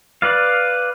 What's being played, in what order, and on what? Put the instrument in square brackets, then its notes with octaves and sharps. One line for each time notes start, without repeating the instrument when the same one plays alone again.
[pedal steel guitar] B4 D5 F5